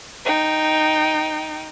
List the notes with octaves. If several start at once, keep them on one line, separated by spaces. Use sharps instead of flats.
D#4 G5